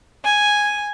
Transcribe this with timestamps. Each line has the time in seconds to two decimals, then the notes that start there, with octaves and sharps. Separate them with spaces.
0.23 G#5